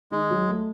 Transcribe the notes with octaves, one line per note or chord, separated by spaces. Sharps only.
D#3 G#3
F#3
A3